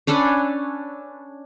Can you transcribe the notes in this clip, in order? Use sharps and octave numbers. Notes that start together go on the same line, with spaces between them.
C#4 D4 A4 B4